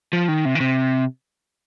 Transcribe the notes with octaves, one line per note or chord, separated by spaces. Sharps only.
F3
D#3
C3
D#3
C3